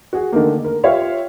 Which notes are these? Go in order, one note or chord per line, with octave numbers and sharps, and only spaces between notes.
F#4 G#4
D3 D#3 A3 A#3
A#4
F4 G4 C#5 E5 F5